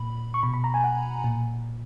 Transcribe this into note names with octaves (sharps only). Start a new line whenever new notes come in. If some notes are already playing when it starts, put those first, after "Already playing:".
Already playing: A#2 B5
C#6
B2 B5
B5
A#5
G#5
F#5
A#2